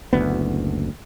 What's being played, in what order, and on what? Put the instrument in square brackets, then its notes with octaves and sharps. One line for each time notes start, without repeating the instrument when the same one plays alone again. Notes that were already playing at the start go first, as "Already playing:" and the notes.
[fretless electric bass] F#1 D2 B3